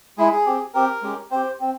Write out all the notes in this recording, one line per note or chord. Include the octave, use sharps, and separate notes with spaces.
G#3 E4 G#4
G#4
C4 G4
C4 G4 A#4
G#3 C#4 G4
C4 G4 C5
C4